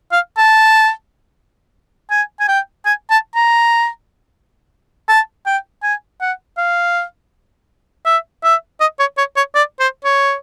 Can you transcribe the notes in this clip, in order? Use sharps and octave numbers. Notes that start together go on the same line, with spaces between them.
F5
A5
G#5
G#5
G5
G#5
A5
A#5
A5
G5
G#5
F#5
F5
E5
E5
D#5
C#5
C#5
C#5
D5
C5
C#5